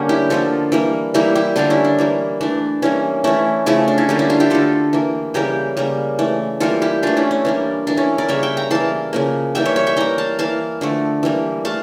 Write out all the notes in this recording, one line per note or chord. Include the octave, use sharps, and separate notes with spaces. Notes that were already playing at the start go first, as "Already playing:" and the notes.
Already playing: D3 G3 A#3 C#4
E4 G4
D3 F3 A#3 F4 A4
E3 G3 A#3
E3 G3 A#3 E4 G4
E4 G4
D3 G3 A#3 D4 F4
C#4 E4
D4
E3 G3 A#3
E3 A3 D4
E3 G3 A#3 C#4
E3 A3 C#4 E4
C#3 F3 A3 C#4 E4
D4
C#4 E4
D3 G3 A#3 D4
C#4 E4
D4 F4
E4 G4
D3 A3 F4 A4
E3 A#3
C#3 E3 G3 A#3 G4 A#4
C#3 G3 A#3
E3 A3
E3 G3 A#3 F4 A4
E4 G4
E3 A3 D4 F4
C#4 E4
C#4
E3 G3 A#3 D4
E3 A#3 D4
C#4 E4
A#4 D5
C#3 G3 A#3 C#5 E5
E5 G5
G5 A#5
E3 A#3 F5 A5
C#3 F3 A#3
E3 G3 A#3 E5 G5
C#5 E5
C#5 E5
E5 G5
E3 A#3 G5 A#5
F5 A5
E3 A#3 F5 A5
D3 F3 A3
E3 G3 A#3
A3 F5 A5